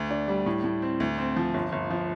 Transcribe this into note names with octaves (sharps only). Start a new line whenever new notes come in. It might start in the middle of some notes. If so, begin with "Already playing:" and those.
Already playing: D2
D4
G3
A2
A2
C4
D2
C4
F3
G1
G1
F3